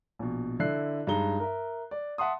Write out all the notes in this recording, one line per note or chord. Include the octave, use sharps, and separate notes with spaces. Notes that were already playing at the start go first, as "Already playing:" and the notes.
A#1 B2
D3 E4 F#6 C7
G2 G#3 D#4 A#5 G7
A#4 E5
D5
E5 F#5 A5 C6 D#6